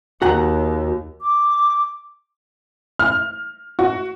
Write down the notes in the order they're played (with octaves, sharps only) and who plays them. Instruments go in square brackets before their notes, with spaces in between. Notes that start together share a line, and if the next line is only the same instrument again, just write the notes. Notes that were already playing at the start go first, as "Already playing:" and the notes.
[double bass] D#2 [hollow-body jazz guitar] F#4 F#5 A#5
[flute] D6
[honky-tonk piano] F6
F#4